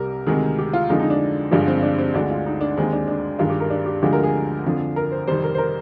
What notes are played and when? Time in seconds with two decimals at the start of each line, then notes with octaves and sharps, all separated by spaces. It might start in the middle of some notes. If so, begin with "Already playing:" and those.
Already playing: C2 C3 G3 A#4
0.27 D2 C3 D#3 G#3
0.59 G4
0.73 F4
0.89 F2 D3 F3 G#3 D#4
0.99 D#4
1.10 D4
1.51 G2 D3 F3 G#3 D4
1.68 C4
1.83 D4
1.99 C4
2.14 D2 D3 G#3 D4
2.30 F4
2.46 D#4
2.61 D4
2.77 D#2 D#3 G#3 C4
2.92 D4
3.08 D4
3.39 G2 D#3 G#3 F4
3.50 G4
3.60 A#4
3.70 D4
3.86 G4
4.02 D2 D3 F3 G#3 G4
4.13 A#4
4.23 G#4
4.64 F2 D3 F3
4.96 A#4
5.12 C5
5.27 F2 C3 D#3 G3 C5
5.43 A#4
5.54 C5
5.58 A#4